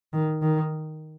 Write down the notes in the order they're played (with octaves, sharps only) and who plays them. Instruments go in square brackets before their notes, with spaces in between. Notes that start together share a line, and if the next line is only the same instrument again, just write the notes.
[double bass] D#3
D#3